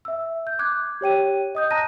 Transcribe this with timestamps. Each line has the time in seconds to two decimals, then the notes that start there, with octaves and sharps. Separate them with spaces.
0.05 E5 E6
0.47 G6
0.59 D6 F#6 G#6
1.01 G4 C#5 G5 D#7
1.55 D#5 D#6 G6
1.71 D#5 A5 A#5 F#6 A#6 D#7